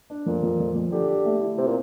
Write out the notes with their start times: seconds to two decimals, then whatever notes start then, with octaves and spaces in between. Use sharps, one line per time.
0.10 D4
0.26 F2 A#2
0.43 F2
0.60 F2
0.75 F2
0.92 D3 G4
1.08 G4
1.25 A3
1.41 E4
1.58 C3 C4
1.67 A#2